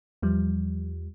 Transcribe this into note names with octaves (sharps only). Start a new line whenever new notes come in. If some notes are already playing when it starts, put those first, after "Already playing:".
E2 F3 G3